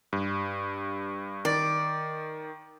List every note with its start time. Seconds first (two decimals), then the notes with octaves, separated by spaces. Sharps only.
0.13 G2
1.45 D#3 D5